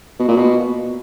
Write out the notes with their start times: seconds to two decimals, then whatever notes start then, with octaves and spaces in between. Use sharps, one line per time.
0.20 B2
0.28 A#2
0.37 B2